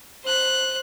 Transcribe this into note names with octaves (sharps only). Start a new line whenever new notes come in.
C5 F#6